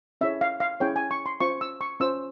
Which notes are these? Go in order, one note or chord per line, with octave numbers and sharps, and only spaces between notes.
C#4 E4 G#4 C#5 E5
F5
F5
C#4 E4 G#4 C#5 G5
G#5
C#6
C6
C#4 F4 C5 C#6
E6
C#6
C#4 F4 C5 E6